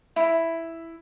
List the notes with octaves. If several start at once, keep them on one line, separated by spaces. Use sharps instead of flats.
E4